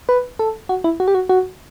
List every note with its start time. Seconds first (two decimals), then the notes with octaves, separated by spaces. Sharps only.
0.09 B4
0.39 A4
0.69 F#4
0.84 E4
1.00 F#4
1.08 G4
1.15 F#4
1.29 F#4